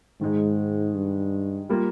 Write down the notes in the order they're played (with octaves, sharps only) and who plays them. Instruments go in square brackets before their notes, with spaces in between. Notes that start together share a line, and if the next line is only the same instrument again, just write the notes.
[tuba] G#2 [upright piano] D#3 G#3 D#4
[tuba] G2
[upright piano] G3 A#3 F4